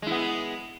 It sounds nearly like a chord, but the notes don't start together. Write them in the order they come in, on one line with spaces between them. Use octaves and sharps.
G#3 E4 B3